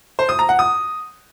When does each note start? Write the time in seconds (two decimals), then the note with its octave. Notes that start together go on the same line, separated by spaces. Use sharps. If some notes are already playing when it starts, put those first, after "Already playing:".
0.19 C5
0.29 D#6
0.39 A#5
0.49 F#5
0.59 D#6